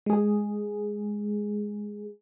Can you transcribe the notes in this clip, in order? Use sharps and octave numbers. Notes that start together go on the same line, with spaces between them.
G#3 G#4